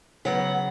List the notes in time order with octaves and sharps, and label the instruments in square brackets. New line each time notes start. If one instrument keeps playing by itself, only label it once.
[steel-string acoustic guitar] C#3 F#3 B3 F#5